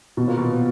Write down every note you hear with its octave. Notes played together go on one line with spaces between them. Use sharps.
B2
A#2
B2